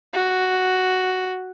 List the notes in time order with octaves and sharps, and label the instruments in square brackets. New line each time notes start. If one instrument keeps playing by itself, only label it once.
[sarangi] F#4